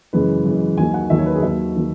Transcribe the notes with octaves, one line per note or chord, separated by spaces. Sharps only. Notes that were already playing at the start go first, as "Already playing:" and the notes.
F#2 C#3 E3 G#3 B4
F#2 C#3 E3 G#3
D#2 D#3 F#3 G#5
F#5
D#2 D#3 F#3 E5
C#5
B4
G#4
D#2 D#3 F#3 E5
D#3 F#3